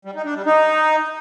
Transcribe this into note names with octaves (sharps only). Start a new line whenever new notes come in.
G3
D#4
D4
G3
D#4